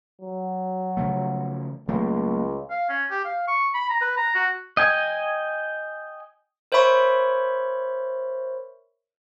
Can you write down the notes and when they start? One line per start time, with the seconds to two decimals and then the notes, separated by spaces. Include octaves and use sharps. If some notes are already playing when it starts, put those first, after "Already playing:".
0.21 F#3
0.97 C#3 F3 A3
1.88 C#2 F#3 A3 A#3
2.70 F5
2.89 C#4
3.11 G4
3.25 F5
3.47 C#6
3.74 B5
3.89 A#5
4.01 B4
4.17 A#5
4.35 F#4
4.77 D#5 G5 G#5
6.72 A#4 C5 C#5 E5 B5 C#6